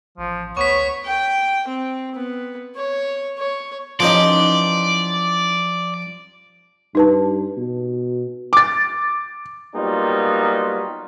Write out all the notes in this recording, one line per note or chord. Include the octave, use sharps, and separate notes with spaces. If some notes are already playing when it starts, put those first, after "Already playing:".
A1 F3
D2 B3 C#5 C#6 B6
G5
C4
B3
C#5
C#5
E3 F3 C#4 D#4 G4 D5 A#5 C6
G2 D#4 B4 A5
B2
D6 A6
F#3 G3 A#3 B3 D#4 F4